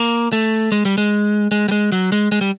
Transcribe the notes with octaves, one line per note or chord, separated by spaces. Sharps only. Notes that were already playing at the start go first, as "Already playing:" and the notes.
Already playing: A#3
A3
G#3
G3
G#3
G#3
G3
G#3
F#3
G#3
G#3
G3